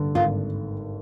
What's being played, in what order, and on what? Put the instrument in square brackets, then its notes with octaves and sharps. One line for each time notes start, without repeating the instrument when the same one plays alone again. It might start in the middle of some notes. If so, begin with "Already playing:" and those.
Already playing: [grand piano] G2 D3
[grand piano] G#1 [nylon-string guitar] F4